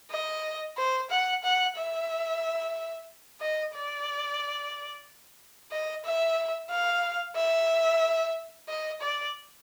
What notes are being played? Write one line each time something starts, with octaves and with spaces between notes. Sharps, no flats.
D#5
C5
F#5
F#5
E5
D#5
D5
D#5
E5
F5
E5
D#5
D5